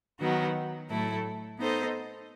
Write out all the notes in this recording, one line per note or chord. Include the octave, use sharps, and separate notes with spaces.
D#3 F#3 B3 F#4
A2 F#3 A3 E4 A4
B3 D#4 A4 C5 D#5